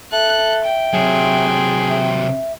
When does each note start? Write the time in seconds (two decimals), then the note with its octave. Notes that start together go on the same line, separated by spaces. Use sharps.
0.12 A4 E5 F#6
0.65 G5
0.94 C3 F#3 G#4
1.90 E5